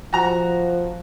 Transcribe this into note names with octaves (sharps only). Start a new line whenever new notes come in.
F3 F#4 A#5